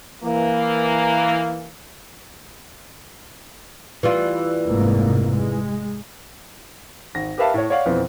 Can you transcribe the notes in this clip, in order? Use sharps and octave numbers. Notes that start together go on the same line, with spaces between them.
E3 A#3
E3 G3 F4
F1 G#2 A#3
G#3
G#1 A#6
G4 A#4 B4 E5 F5 A5
A2 C#5
C#5 D5 F5 F#5
F2 B2 E3 C4